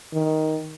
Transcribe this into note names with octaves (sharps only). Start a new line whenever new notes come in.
D#3